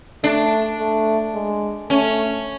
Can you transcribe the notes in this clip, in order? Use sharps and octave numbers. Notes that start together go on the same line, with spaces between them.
A3 D4
A3
G#3
A3 C#4